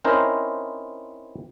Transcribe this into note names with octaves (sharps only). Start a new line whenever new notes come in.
C4 C#4 D#4 E4 A#4 C5